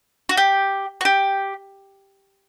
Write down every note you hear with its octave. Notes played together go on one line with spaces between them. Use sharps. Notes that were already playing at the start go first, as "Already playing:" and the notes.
F#4
G4
F#4
G4